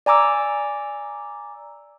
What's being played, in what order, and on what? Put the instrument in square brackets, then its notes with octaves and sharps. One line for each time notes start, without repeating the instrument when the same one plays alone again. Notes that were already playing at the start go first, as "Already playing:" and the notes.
[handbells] D5 G#5 A#5 D6 E6